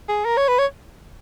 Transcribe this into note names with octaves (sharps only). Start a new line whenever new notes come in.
G#4
A#4
C#5
B4
C#5